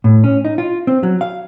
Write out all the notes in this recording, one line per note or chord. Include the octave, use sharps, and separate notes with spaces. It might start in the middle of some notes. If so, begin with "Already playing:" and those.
A2
C#4
D#4
F4
C4
F#3
F5